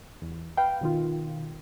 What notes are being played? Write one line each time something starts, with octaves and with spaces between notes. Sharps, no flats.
E2
B4 F5 G5
B2 D#3 F4